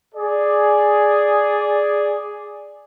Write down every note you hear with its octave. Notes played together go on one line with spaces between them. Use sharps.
G#4 D5